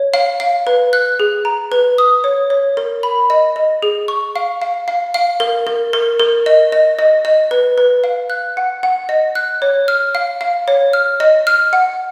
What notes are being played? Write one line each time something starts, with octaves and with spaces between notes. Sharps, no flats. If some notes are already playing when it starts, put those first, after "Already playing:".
Already playing: C#5
F5
F5
B4
F#6
G#4
A#5
B4
D#6
C#5
C#5
A#4
B5
D#5
D#5
G#4
C#6
F5
F5
F5
F5
A#4
A#4
A#4
A#4
D#5
D#5
D#5
D#5
B4
B4
F5
F#6
F#5
F#5
D#5
F#6
C#5
F6
F5
F5
C#5
F6
D#5
F6
F#5